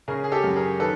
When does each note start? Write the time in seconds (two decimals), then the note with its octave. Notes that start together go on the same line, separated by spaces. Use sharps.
0.08 C#3 G#4 A#4
0.24 G#4
0.32 G4 A4
0.44 F#2
0.56 G#4 A#4
0.80 D#3 A4 B4